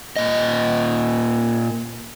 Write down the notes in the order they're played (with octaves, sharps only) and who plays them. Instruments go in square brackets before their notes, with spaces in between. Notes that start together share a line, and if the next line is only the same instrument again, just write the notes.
[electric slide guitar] A#2 D#5